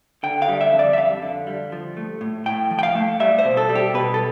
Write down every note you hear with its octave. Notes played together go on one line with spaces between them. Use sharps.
D3 G5
F5
G3
E5
F2
D5
E5
F2 F5
D3
G3
F3
A3
A2
A2 G5
F3
G5
F5
A3
G3 E5
C5
B2
A4
G3
G4
B2 B4
A4